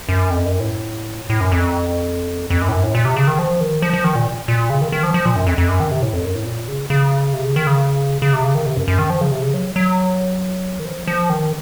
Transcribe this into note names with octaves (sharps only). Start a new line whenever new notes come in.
F#2
F2
F#2
A2
A2
F#2
F2
F2
F#2
A2
F#2
A2
A#2
C3
C#3
D#3
F3
D#3
F3
F3
D#3
A#2
A#2
C#3
D#3
D#3
F3
F3
A#2
F#2
F2
F2
F#2
D#3
C3
A2
F2
F#2
A2
A#2
C#3
C#3
C3
C#3
D#3
C#3
C#3
C3
C#3
D#3
C3
F#2
F#2
D#3
F3
C#3
C3
C#3
F#3
F#3
D#3
F3
F3
D#3